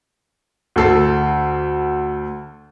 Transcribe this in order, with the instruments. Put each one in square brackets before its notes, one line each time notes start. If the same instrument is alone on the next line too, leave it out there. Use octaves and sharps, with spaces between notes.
[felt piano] D2 A4 C7